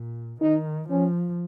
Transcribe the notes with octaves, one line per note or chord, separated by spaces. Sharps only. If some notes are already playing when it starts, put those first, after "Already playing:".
Already playing: A#2
D#3 D#4
F3 C#4